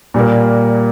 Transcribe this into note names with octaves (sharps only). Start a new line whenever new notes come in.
A#2 G3 A#3